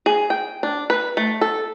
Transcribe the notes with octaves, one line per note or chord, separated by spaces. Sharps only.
G#4
G5
D4
B4
A3
A4